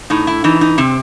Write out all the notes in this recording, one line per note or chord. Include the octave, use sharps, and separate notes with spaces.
A2 D#4
E4
E3 D#4
D#4
C3 C4